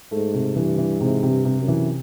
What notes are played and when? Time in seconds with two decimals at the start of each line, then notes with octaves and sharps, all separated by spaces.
0.11 G#2 A3
0.34 C3
0.56 G2 E3
0.78 E3
1.00 G#2 C3
1.23 C3
1.30 G2
1.45 C3
1.61 F#2
1.68 E3